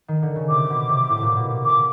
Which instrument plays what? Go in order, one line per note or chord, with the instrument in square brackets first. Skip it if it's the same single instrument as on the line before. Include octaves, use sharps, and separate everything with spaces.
[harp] D#3
D3
C#3
[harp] C3 [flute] D6
[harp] B2
C3
A2
A#2
B2
C3
[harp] C#3 [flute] D6